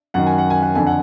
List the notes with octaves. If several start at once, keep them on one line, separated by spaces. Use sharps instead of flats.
F#2 D#3 F#5
G#5
F#5
G#5
F#5
F2 D3 G#5
F#5